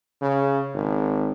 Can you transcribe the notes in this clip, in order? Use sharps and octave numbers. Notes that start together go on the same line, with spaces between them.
C#3
G#1